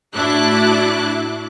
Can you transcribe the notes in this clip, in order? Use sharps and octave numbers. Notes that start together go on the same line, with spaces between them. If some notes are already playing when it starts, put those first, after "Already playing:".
A2 D4 E4 F#4 D6 F#6